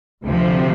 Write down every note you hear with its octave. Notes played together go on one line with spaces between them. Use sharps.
D2 C3 F3